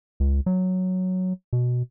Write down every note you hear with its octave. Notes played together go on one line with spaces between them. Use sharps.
C#2
F#3
B2